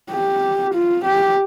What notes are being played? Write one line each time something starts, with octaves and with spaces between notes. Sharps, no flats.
G4
F4
G4